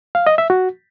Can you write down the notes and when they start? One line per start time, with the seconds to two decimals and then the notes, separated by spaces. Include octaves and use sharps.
0.15 F5
0.27 D#5
0.38 E5
0.50 F#4